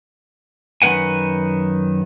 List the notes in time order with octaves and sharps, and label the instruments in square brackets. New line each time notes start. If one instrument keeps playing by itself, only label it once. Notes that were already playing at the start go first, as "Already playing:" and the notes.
[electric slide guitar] F#2 D#3 B3 B4 F#5 G#5